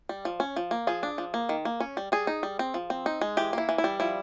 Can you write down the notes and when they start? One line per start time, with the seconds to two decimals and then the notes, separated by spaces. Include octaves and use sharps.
0.09 G3
0.25 F3
0.40 C#4
0.56 F3
0.71 A#3
0.87 F3 G#4
1.03 D4
1.18 F3
1.34 A#3
1.49 D#3
1.65 A#3
1.80 C#4
1.97 G3
2.12 G3 G#4
2.27 D#4
2.43 G3
2.59 C4
2.74 F3
2.90 C4
3.06 D#4
3.21 G#3
3.37 E3 G4
3.53 A#3 E4
3.69 E3
3.78 E4
3.84 G3
4.00 F3 E4